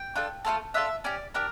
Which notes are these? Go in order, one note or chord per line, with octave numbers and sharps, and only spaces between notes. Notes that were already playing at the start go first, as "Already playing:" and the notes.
Already playing: G5
D4 F4 A4
A3 C#4 F4 A4
D4 F4 A4 E5
C#4 G4 D5
D4 G4 A#4